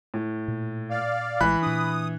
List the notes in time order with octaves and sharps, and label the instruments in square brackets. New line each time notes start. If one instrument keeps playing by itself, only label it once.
[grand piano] A2
[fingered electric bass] A#2
[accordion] D5 F5
[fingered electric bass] A1 G#3 [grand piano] E3 [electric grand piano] B5 F#6
[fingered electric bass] A#2 D4 [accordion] D#6